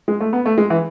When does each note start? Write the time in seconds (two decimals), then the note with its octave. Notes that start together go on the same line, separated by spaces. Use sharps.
0.08 G#3
0.21 A3
0.33 B3
0.46 A3
0.58 G#3
0.70 E3